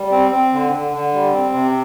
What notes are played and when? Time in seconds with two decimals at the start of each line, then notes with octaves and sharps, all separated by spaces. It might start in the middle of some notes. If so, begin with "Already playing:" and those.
Already playing: G3
0.11 C4
0.32 C4
0.53 D3
0.73 D3
0.94 D3
1.14 G3
1.33 C4
1.53 C3